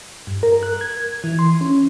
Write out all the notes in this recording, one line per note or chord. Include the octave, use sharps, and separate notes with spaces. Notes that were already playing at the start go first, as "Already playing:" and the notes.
G2
A#4
F#6
G#6
E3
C6
C#4